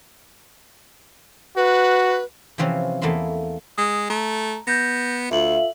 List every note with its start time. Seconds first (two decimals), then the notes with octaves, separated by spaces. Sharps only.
1.57 F#4 B4
2.58 C3 E3 F3 C4 C#4
3.02 E2 A3 A#3 E4 C6
3.78 G#3 D#6
4.10 A3 A#5
4.67 B3 G6 A#6
5.31 D2 F4 A4 E5 F#7